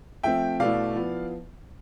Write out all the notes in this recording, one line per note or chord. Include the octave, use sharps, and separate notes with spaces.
F3 A3 C4 E5 G5
B2 A3 E4 D5 F5
F3 B3 E4